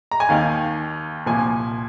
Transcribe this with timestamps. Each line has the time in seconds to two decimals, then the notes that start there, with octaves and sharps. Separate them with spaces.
0.11 A#5
0.20 G#5
0.29 D#2 D#3 F5
1.26 C2 A#2 F3 G#5